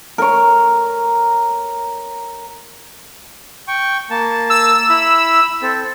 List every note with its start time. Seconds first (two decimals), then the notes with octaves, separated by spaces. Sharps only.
0.18 A#4 C#5
3.68 G5 C#6
4.10 A#3 A5
4.50 E6
4.90 E4 B5
5.62 C4 A4